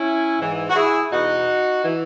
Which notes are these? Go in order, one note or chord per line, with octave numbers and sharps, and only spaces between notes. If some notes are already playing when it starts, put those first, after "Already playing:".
Already playing: C#4 E4
G#2 E3
F#4
E4 G#4
E2 B2 D#4 F#4
E3